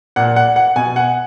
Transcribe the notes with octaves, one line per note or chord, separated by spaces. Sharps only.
A#2 F#5
F#5
F#5
B2 G#5
F#5